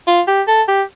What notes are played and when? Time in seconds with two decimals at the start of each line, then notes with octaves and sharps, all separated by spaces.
0.07 F4
0.27 G4
0.48 A4
0.68 G4